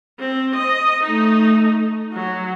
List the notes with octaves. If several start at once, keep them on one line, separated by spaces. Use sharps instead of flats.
C4
D#5
A3 D#4
F#3